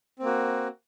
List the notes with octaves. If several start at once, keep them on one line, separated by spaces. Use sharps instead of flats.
A#3 C4 F#4